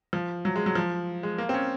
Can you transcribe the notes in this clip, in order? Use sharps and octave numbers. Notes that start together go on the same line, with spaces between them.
F3
F#3
G#3
F#3
F3
G#3
A#3
C4
C#4